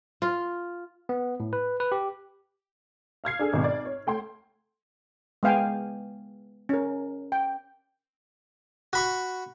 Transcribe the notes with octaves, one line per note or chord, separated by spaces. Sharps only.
F4
B3
A2
B4
B4
G4
F5 F6 G#6 C7
D4 G#4 A4
G#1 B2
D5
C#5
A3 G5 C6 G#6
G#3 B3 F5 G5 G#5
C#4 A#4
G5
F#4 B5 C#6